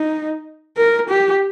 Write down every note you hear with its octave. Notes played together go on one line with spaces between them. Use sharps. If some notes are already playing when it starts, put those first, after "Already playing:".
Already playing: D#4
A#4
G4